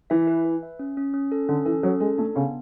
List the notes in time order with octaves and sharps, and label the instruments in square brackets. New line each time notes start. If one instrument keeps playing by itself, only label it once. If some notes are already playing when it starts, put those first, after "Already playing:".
[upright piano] E3 [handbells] E5
[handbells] B4
B4
E5
C#4
C#4
C#4
A4
[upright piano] D3 [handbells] C#4
[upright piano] E3 [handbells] A4
[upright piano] F#3 [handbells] C#4
[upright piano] G#3 [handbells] A4
[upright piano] A3 [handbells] D4
[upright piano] C#3 [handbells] B3